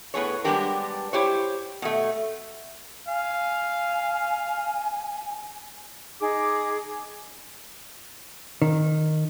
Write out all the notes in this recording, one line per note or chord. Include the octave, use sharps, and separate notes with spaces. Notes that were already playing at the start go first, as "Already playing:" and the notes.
A2 B3 G#4 C#5
G3 G#3 B3 D4 G4 A#4
E4 G4 C5 C#5
B2 A3
F5 G#5
D#4 G#4 D6
D#3